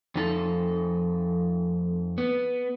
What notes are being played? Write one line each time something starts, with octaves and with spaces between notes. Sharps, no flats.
F2 F3 D#4 A4
B3